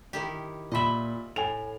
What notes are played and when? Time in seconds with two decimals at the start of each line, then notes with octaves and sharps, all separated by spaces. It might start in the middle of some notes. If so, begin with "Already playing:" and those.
0.13 D#3 E4 G4
0.72 A#2 D#5 E5 B5 F#7
1.36 A2 G#5 F7